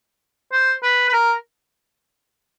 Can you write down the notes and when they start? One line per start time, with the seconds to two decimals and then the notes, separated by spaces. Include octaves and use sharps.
0.53 C5
0.83 B4
1.09 B4
1.13 A#4